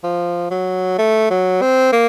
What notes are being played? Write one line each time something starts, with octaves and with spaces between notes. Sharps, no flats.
F3
F#3
A3
F#3
C4
A#3